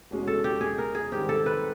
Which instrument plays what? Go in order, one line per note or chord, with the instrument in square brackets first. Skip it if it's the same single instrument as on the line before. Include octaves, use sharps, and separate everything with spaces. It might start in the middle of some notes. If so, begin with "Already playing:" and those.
[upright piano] E2 B2 G#3 C#4 F#4
[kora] A4
G4
G#4
A#4
G#4
[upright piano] G#2 D#3 G3 C4 [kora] G4
[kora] A4
B4